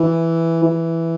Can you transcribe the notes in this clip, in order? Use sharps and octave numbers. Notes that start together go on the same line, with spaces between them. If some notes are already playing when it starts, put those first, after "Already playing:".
Already playing: E3
E3